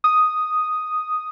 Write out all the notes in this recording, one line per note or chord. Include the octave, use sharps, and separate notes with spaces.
D#6